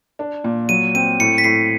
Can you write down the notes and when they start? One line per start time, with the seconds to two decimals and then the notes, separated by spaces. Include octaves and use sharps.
0.19 D4
0.44 A#2
0.69 F#3 D#7
0.95 C4 D#7
1.20 A2 C#7
1.38 B6
1.44 A2 C7